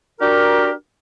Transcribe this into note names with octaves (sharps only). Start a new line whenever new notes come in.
D4 F#4 G4 A#4